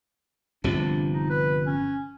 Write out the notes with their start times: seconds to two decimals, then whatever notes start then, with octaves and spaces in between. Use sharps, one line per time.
0.64 G1 C3 F3 D4
1.13 D#4
1.30 B4
1.66 C#4